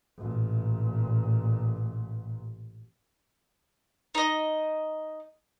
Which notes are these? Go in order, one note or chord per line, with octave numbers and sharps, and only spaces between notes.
A1 A#2
D#4 D#5